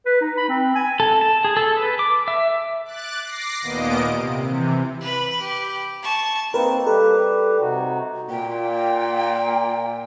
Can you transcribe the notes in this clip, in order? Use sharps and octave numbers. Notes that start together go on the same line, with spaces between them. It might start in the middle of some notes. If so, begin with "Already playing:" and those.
B4
D#4
B5
C4
G#5
A4
A5
G#4
A4
B4
D6
E5
D6 F#6 A6
D6 A#6 C7
D#2 A#2 A#3 B3 D#5 D7
C3
C3 E3
B4 B5
G4
A5 C#6
A#3 C4 D#4 A#4 B4
G3 G4 A4 B4
C3 D#4 F#4
A#2 G5